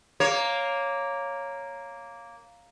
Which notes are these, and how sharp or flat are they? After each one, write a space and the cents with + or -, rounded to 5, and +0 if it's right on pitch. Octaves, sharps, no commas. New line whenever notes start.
A#3 +0 C#5 +0